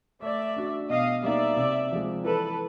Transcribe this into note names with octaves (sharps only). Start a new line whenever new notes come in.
A3 D5 E5
D4 F#4
B2 D#5 F5
G3 A#3 D#4 D5 E5
C3
F3 G#3
E3 A4 B4